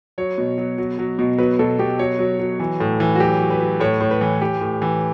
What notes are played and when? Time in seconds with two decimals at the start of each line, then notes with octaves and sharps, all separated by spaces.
0.18 F#3 C#5
0.38 B2
0.58 F#3
0.78 F#3
0.99 F#3
1.19 B2
1.38 F#3 B4
1.59 B2 A4
1.79 B2 G4
1.99 F#3 C#5
2.19 F#3
2.39 F#3
2.60 E3
2.80 A2
3.00 E3
3.15 F#4
3.20 F#3 G4
3.40 F#3
3.50 B4
3.61 F#3
3.80 A2 C#5
4.01 A2
4.11 B4
4.21 E3
4.41 E3 G4
4.61 A2
4.82 E3